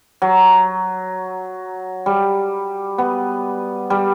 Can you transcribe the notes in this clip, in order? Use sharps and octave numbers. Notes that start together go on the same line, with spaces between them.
F#3
G3
B3
G3